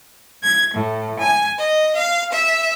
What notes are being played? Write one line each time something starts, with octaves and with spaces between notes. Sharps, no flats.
G#6
A2
G#5
D#5
F5
E5